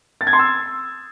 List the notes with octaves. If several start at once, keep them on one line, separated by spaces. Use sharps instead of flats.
A6
G#6
C6
E6